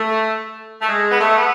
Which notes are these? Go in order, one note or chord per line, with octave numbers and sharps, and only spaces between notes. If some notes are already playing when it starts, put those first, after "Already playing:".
Already playing: A3
A3
G#3
B3
A3
B3